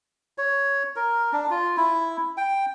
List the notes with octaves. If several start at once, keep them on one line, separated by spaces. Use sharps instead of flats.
C#5
A#4
D4
F4
E4
G5